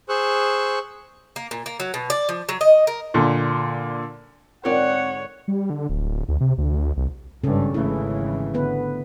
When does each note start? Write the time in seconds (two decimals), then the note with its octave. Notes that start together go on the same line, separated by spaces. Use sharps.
0.09 G#4 C5 C#6 E6 F#6
1.36 A#3
1.51 A#2
1.66 A#3
1.80 F#3
1.94 B2
2.10 D5
2.29 F3
2.49 F#3
2.61 D#5
2.87 A#4
3.14 A#2 D3
4.65 G#2 D3 C4 F4 A#4 C#5 D5 F#5
5.48 G3
5.70 D3
5.89 D1
6.28 D2
6.41 C3
6.58 D2
6.97 C2
7.44 G#1 G2 C#3 C#4 A4
7.74 G#1 C#3 E3 A3 E4
8.54 D3 B3 B4